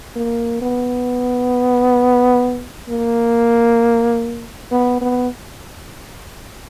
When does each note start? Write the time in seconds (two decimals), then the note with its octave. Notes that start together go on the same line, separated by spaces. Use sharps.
0.16 A#3
0.62 B3
2.89 A#3
4.71 B3
5.01 B3